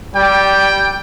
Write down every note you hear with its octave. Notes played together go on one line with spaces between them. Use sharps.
G3 G5